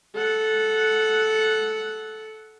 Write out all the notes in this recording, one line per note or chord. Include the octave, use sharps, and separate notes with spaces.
A4 F#5